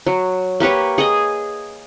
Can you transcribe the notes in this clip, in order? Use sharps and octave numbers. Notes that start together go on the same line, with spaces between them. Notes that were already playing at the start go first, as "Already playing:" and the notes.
F#3
A#3 G4 B4 C#5
G#4 D#5